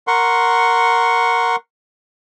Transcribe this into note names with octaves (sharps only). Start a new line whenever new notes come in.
A#4 F#5 C6 C#6